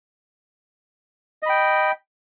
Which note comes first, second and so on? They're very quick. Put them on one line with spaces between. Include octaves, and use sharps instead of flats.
D#5 B5 G5